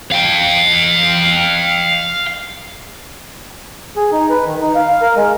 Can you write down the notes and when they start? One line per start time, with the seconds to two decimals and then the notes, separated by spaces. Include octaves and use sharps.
0.11 F5 G5
3.96 G#4
4.12 D#4
4.30 B4
4.46 D#3
4.61 D#4
4.75 F5
4.88 F5
5.02 A#4
5.16 G#3